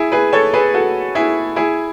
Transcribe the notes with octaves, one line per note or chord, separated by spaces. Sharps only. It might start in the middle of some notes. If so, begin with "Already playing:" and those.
Already playing: E4 G#4
G#4 B4
A4 C#5
G#4 B4
F#4 A4
E4 G#4
E4 G#4